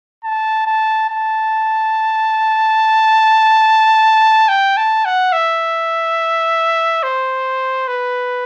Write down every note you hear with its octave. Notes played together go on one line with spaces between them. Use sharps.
A5
A5
A5
G5
A5
F#5
E5
C5
B4